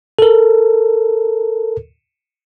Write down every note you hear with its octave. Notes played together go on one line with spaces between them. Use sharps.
A4 A#4